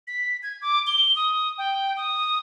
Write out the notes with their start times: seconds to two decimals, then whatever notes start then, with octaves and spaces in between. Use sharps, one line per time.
0.07 B6
0.43 G#6
0.62 D6
0.87 G7
1.16 D#6
1.58 G5
1.97 D#6